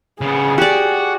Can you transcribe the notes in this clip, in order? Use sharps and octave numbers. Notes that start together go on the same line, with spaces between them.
C#3 B3 G#4
F#4 G4 D5